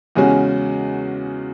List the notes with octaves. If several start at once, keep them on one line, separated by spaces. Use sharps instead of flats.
E2 C#3 G#3 C#4 F#4